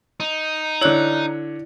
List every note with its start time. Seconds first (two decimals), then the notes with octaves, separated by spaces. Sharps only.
0.20 D#4
0.81 D3 E4 C#5 D5 F#6